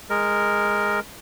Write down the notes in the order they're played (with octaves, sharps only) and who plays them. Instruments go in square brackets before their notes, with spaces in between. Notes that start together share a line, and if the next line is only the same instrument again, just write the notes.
[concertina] G#3 A#4